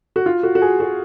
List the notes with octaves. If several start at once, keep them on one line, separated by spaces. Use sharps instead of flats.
F#4
F4
F#4
F#4
G#4
F#4